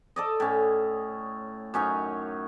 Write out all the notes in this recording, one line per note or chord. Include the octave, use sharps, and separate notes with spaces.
A4 D5 D#5
A2 C#4
F#2 C#4 D#4 C#5